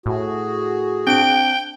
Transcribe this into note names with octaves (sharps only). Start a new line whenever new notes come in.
A2 F#4 G#4
C4 D4 G5 D7